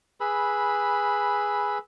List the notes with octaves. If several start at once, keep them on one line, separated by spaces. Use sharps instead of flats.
G#4 B4 B5 E6